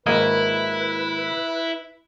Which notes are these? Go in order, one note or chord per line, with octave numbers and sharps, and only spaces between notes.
G#1 A#3 E4 B4 D#5